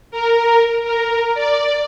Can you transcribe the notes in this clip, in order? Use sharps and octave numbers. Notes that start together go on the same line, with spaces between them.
A#4
A#4
D5